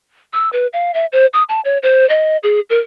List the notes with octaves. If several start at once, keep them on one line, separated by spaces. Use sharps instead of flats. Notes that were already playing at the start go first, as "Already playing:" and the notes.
E6
B4
F5
E5
C5
D#6
A5
C#5
C5
D#5
G#4
A#4